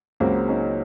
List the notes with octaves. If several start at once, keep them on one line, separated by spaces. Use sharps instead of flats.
C#2 C#3 F#3 A#3 C4
C#4 D#4